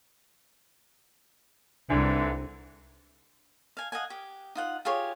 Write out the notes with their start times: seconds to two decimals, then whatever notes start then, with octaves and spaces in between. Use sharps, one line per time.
1.90 C2 G#2 D3 E3 D4
3.77 F5 G#5
3.92 D#5 F5 F#5 G#5
4.10 G4
4.55 D#4 F4 F#5
4.85 F4 G4 G#4 C#5